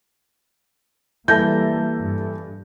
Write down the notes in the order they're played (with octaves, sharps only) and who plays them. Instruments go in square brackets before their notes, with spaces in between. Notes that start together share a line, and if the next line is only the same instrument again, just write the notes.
[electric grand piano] E3 A#6 [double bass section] G3 A#3 [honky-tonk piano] A4 E5 A5 [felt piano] G6
[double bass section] G2